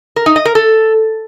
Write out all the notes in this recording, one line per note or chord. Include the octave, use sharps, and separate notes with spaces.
A#4
D#4
D#5
A#4
A4